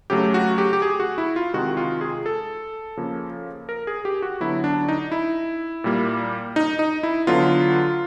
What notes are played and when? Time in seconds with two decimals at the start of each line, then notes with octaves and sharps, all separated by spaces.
0.10 C#3 F#3 A3 G4
0.34 F#4
0.58 G4
0.73 G4
0.82 G#4
1.00 F#4
1.18 E4
1.36 F4
1.54 C3 D#3 G#3 F#4
1.77 F4
2.01 G#4
2.26 A4
2.97 C#3 F3 A#3
3.69 A#4
3.87 G#4
4.05 G4
4.22 F#4
4.40 D3 F#3 B3 E4
4.64 D4
4.88 D#4
5.12 E4
5.84 A#2 G3 A#3
6.56 D#4
6.79 D#4
7.03 E4
7.27 D3 F#3 B3 F4